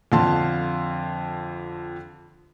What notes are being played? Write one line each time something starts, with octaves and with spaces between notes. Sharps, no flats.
F2 D3 F5 A5 C6